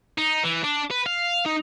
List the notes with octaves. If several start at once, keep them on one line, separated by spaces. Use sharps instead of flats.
D#4
E3
D4
B4
F5
D#4